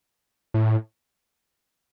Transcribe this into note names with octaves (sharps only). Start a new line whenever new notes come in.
A2